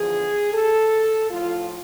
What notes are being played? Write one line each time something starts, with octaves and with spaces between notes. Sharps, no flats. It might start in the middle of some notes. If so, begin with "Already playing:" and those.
Already playing: E2 D3 F3 G#4
A4
A2 F3 F4